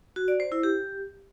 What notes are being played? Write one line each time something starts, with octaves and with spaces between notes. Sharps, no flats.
F#4
D5
C5
E4
G4